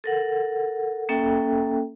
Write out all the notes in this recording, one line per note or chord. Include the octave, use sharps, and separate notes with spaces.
A4 A#4 F#5
A#3 C#4 A4 E5 G5